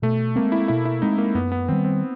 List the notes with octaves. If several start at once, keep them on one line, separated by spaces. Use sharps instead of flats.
B2 A3
G#3 A#3 C4
E4
B2 E4
E4
G#3 C4 D#4
A#3
F#2 B3
B3
D#3 G3 C4
C4